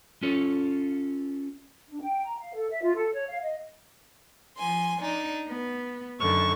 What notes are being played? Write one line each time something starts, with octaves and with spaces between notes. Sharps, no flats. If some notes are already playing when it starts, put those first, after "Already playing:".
C#4 F4 A4 C#5
D4
G5
A#5
F5
A4
E5
F4
A4
C#5
F5
D#5
F3 G#5 C6
D4 D#4
B3
F#2 D3 D#3 C#6